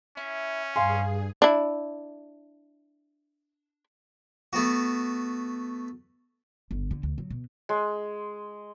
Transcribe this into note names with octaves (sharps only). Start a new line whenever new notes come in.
C#4 E4
G2 G#4 F5 G#5 C6
D4 E4
A3 B3 F#4
G1
D3
D2
F#3
B2
G#3